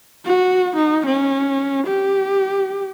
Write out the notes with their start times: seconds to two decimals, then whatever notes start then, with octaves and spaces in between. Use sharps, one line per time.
0.25 F#4
0.76 D#4
1.06 C#4
1.87 G4